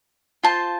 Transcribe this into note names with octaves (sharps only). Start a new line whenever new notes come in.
F4 C5 A5